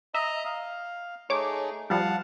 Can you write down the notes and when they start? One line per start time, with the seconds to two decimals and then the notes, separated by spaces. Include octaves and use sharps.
0.14 D#5 E5 A#5
0.45 F5
1.30 A3 D#4 G#4 C#5 D6
1.90 F3 G3 F5 F#5 A5